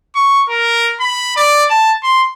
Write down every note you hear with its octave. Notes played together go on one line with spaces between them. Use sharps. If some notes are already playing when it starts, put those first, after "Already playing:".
C#6
A#4
B5
D5
A5
C6